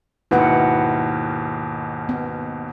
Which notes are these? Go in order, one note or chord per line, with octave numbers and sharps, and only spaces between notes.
D#2 G#2 B2 E4 B4 F#5
B3